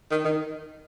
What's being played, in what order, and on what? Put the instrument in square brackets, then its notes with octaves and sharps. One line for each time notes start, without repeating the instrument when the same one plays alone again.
[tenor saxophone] D#3
D#3